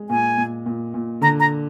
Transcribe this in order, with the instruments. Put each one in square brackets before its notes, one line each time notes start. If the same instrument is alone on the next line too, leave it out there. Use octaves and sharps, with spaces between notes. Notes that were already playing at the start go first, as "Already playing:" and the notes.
Already playing: [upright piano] G#3
[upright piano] A#2 [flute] G#5
[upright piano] A#2
A#2
A#2
[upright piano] D3 [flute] A#5
[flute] A#5